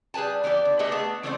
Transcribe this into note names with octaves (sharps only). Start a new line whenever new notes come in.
G3 G#4 B4 G#5 A5
E3 B3 G4 D5
D3
A3 G4 G#4 B4 D#5 E5
A3 B3 G#4 E5 A5
E3 A3 C4 C#4 C5 D5